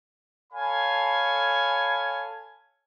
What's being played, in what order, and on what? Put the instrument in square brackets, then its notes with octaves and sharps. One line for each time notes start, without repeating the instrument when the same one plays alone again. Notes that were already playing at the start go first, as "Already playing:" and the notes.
[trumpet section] A4 C#5 F5 G#5 B5